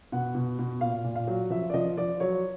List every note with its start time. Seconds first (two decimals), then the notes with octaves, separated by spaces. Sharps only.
0.12 B2 F#5
0.35 B2
0.59 B2
0.81 A#2 F5
1.04 A#2
1.16 F5
1.27 F#3
1.50 F3 E5
1.70 D5
1.74 F3 D#5
1.97 F3 D5
2.20 F#3 C#5